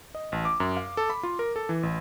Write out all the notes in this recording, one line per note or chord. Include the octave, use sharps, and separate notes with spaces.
D#5
A1
D6
F#2
F5
A4
B5
F4
A#4
A4
E3
A1